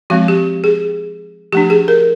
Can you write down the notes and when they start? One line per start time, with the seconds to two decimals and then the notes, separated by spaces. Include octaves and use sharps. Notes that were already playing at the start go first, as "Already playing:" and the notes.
0.10 F3 G#3 C4 F#4
0.28 G4
0.64 G#4
1.52 F3 A3 D4 G4
1.70 G#4
1.88 A#4